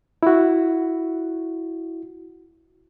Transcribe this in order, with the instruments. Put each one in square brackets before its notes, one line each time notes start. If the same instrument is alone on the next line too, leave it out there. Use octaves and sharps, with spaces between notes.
[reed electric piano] E4 F#4